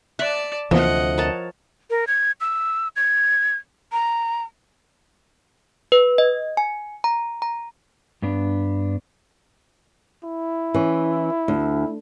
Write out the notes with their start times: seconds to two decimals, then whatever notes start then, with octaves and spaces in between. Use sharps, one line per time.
0.19 D5 E5 A5 F#6
0.71 D2 C3 E3 F3 A#3 B3 D#5 F#5
1.18 A#4 C#5 A5
1.90 A#4
2.07 G#6
2.41 E6
2.96 G#6
3.92 A#5
5.92 B4
6.18 D#5
6.57 G#5
7.04 A#5
7.42 A#5
8.22 G2 B3 D4
10.24 E4
10.74 E3 C#4
11.48 D2